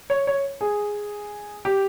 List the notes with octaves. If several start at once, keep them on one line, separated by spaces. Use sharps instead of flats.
C#5
C#5
G#4
G4